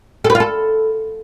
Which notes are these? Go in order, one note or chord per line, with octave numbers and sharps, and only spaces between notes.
A4
B4
F4
A4